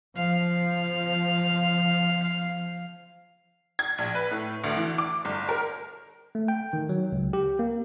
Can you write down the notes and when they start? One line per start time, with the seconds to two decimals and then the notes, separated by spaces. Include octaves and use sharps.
0.16 F3 F5
3.79 G#6
3.98 A#1
4.15 B4
4.31 A2
4.64 D2
4.77 E3
4.98 D6
5.25 G1
5.49 A#4
6.35 A3
6.48 G5
6.73 D#3
6.89 F#3
7.12 C#2
7.33 G4
7.59 A#3